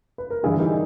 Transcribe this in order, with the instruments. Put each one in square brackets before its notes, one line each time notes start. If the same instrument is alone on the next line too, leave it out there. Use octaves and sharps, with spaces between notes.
[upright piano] B4
A#4
G2 E3 E4 G#4
D#4 G4